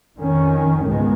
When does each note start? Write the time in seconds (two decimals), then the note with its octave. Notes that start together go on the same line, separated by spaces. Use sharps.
0.17 F2 D#3 C#4
0.84 C#2 G#2 D#3 G#3 B3